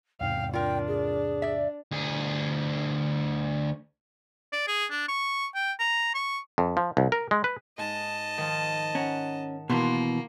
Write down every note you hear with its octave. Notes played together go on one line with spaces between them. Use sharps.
E2 G#2 C3 F5 G5
D4 F4 A#4 G5
G#4
D5 E5
D2 G#4
D5
G#4
D4
C#6
G5
A#5
C#6
F2
F3
C2
A#4
G#3
B4
G#2 D#5 A5
D#3 F3
C#4 F#5 A#5
B2 E3 A#3 A5 C6